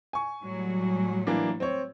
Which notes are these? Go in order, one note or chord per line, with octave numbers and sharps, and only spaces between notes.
G#5 C#6
A2 F#3 G3
E3 A#3 D4
C4 C#5